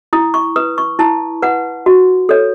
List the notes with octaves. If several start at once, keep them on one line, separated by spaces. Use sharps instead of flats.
E4 D#6
C#6
B4 D#6
C#6
E4 A5
B4 F#5
F#4
A4 C#5